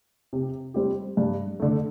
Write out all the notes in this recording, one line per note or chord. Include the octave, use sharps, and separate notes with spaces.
C3
G3 C4 G4
G2
D3 A3